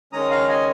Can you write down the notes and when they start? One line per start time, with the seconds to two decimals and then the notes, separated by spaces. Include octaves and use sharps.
0.13 D#3 G#3 C#4 A#5 D#6
0.31 F5 A#5
0.48 D#5 G#5